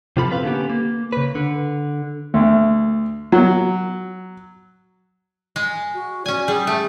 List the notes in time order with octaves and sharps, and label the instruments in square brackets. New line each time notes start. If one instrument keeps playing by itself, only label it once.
[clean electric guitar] C3 F3 F4 A4 B5
C4 B4 F5
D3 A#3 B3 C#4 G4
A#3
C#3 B4
D3
[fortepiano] D2
F#3
[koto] G#3
[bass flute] F#4
[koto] C#4 G#5 [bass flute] D5
[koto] G3 [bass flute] G#4
[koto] A3